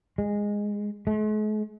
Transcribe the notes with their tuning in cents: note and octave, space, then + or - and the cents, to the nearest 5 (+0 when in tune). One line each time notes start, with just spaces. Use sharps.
G#3 -10
G#3 +45